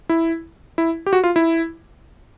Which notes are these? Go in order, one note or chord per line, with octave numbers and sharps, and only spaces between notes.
E4
E4
G4
F#4
F4
E4